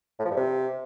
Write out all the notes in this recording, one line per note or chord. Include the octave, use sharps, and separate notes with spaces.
A2
F3
G2
C3